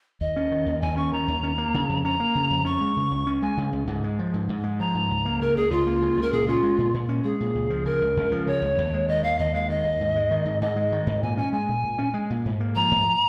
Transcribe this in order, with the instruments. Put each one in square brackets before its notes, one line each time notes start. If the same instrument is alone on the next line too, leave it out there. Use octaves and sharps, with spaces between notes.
[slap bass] D#2 [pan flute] D#5
[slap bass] C#4
D#3
D#2
[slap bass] D#2 [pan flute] G#5
[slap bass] C#4 [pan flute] C#6
[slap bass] D#3 [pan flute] A#5
[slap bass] D#2
C#4
A#3
C#3
F2
[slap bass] C#4 [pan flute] A#5
[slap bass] A#3
C#3
F2
[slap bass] C#4 [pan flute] C#6
[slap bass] G#3
C#3
C#2
C#4
[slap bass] G#3 [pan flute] G#5
[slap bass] C#3
C#2
G#2
G#3
F3
G#2
G#2
G#3
[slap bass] F3 [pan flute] A#5
[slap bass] G#2
C#2
A#3
[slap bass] C#3 [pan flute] A#4
[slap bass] C#2 [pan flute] G#4
[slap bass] C#2 [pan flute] F4
[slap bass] A#3
C#3
[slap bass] C#2 [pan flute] A#4
[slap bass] A#2 [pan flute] G#4
[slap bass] C#4 [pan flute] F4
[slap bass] G#3
A#2
A#2
C#4
[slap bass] G#3 [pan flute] G#4
[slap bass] A#2
C#2
F3
[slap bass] C#3 [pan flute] A#4
[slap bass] C#2
C#2
F3
[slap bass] C#3 [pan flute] C#5
[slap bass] C#2
D#2
G#3
[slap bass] D#3 [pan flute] D#5
[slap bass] D#2 [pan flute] F5
[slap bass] D#2 [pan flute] D#5
[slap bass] G#3 [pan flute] F5
[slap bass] D#3 [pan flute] D#5
[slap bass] D#2
G#2
G#3
D#3
G#2
[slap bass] G#2 [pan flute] D#5
[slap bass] G#3
D#3
G#2
[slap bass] A#2 [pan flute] G#5
[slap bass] C#4 [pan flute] G#5
[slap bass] G#3 [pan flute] G#5
[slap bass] A#2
A#2
C#4
G#3
A#2
G#2
A#3
[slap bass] F3 [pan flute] A#5
[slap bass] G#2